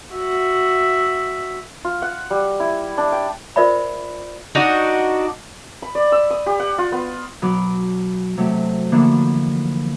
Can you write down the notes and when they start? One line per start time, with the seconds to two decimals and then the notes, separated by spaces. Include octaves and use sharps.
0.13 F#4 E5
1.85 F4
2.02 F#5
2.30 G3
2.60 E4
2.98 D4
3.12 G5
3.56 F4 A#4 C5 D5 E5 B5
4.55 D4 D#4 F#4
5.82 B5
5.95 D5
6.12 E6
6.30 D#6
6.46 G4
6.60 F#5
6.78 F4
6.92 B3
7.42 B2 F#3 B4 D6
8.37 C3 F#3 A3
8.92 D3 E3 F3 A#3 B3 D4